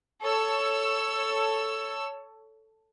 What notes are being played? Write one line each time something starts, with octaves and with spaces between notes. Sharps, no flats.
A4 C#5 E6